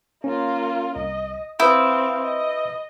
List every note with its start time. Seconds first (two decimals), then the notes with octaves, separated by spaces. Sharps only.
0.24 A#3 C#4 F4
0.96 C2 D#5
1.60 C4 E4 B4 F5 D#6 G6
2.24 D#5